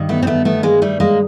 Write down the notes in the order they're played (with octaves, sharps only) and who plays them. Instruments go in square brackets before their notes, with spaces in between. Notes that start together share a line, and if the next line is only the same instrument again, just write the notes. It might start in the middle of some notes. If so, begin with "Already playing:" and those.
Already playing: [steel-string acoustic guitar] G2 D#3
A3 B3
C4
A3 B3
A3 B3
G#3 A#3
G3 A3
G#3 A#3